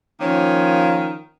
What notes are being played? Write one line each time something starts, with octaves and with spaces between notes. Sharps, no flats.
D#3 F3 A#3 C#4